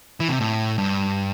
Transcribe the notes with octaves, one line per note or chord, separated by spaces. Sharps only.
E3
C3
A2
G2